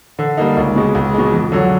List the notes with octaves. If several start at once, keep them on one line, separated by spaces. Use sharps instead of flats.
D3
G3 A#3 D#4
C#2
B2 G#3
C#2
B2 G#3
F2
D3 F#3